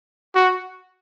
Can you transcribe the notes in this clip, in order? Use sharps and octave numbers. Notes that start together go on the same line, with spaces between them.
F#4